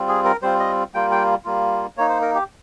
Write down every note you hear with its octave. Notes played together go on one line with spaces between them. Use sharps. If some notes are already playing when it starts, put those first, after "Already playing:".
Already playing: G3 C4 F4
G#4
A#4
G3 C4 F4 C5
D#5
G3 A#3 F4 G5
G5
G3 A#3 F4
A#3 D#4 C#5
C5
A#4
G4